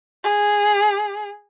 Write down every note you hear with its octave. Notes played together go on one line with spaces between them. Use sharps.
G#4